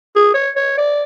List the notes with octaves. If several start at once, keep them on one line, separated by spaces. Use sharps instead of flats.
G#4
C#5
C#5
D5